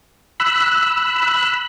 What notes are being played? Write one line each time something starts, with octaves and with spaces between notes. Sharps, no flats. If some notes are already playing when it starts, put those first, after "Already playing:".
B5 E6 F#6